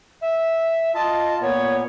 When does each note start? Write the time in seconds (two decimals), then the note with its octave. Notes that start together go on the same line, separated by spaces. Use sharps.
0.21 E5
0.95 F4 D#5 A5
1.41 A#2 B3 C#5